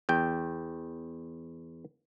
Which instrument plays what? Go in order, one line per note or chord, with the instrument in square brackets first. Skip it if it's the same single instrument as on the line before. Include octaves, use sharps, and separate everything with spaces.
[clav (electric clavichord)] E2 G5